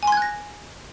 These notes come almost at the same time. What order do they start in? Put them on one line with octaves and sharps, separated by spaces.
G#5 C6 G#6 F#6 A#6